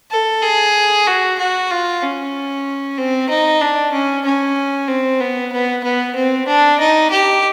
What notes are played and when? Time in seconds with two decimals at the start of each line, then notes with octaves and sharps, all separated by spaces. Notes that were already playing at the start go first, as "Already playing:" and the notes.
0.11 A4
0.43 G#4
1.07 F#4
1.39 F#4
1.71 F4
2.02 C#4
2.98 C4
3.29 D#4
3.61 D4
3.92 C#4
4.25 C#4
4.88 C4
5.20 B3
5.53 B3
5.84 B3
6.16 C4
6.47 D4
6.80 D#4
7.11 G4